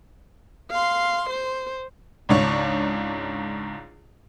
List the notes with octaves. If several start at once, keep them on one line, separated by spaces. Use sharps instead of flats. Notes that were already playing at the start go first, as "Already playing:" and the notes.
F5 C6
C5
C#2 G#2 D4 C#5